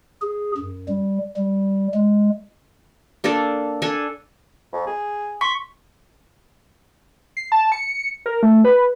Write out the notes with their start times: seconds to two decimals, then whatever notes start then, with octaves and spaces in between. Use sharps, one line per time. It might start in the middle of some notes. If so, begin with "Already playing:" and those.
0.22 G#4
0.57 F#2
0.88 G3
1.36 G3
1.94 G#3
3.24 A#3 D4 A4 D5
3.82 D4 A4 G#5
4.73 F2
4.87 G#4
5.41 C6 C#6 B6
7.37 C7
7.52 A5
7.72 C#7
8.26 A#4
8.43 A3
8.64 B4